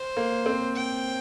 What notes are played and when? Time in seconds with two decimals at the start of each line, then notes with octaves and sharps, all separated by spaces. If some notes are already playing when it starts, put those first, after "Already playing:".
Already playing: C5
0.17 A#3
0.46 C4
0.76 G5